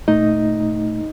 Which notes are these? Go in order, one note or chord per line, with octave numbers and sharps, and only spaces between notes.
A#2 A3 D#4 D#5